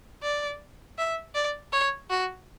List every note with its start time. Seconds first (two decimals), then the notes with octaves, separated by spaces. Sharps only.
0.22 D5
0.98 E5
1.35 D5
1.72 C#5
2.10 F#4